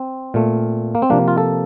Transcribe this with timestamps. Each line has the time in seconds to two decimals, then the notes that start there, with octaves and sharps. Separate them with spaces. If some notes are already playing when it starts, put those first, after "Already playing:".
Already playing: C4
0.34 A#2 A3
0.95 A#3
1.02 C4
1.10 C3 F3 A#3 D4
1.28 F4
1.38 A4